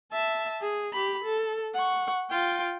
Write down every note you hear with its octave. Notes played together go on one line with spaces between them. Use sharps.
E5 A5
G#4
G4 B5
A4
F#5 C#6
F4 G5